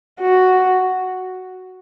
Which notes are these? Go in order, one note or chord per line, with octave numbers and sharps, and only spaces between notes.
F#4